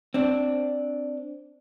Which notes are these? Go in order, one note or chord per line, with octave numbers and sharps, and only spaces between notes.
C4 D4